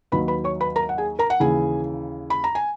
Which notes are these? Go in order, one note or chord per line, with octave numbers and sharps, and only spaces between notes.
D#2 D#3 F#3 B4 B5
B4 B5
C#5 C#6
B4 B5
A#4 A#5
F#5
G#4 G#5
A#4 A#5
F#5
D#2 C#3 E3 G#4 G#5
B5
A#5
G#5